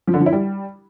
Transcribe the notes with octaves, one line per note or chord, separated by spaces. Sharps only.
F3
D3
F3
E4
G3